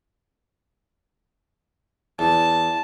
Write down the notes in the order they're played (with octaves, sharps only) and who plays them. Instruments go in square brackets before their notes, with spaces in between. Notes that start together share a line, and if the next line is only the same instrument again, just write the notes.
[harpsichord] E2 [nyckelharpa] A5